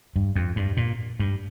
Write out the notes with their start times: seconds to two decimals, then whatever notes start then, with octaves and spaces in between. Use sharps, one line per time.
0.16 G2
0.36 F2
0.56 G2
0.77 A#2
1.20 G2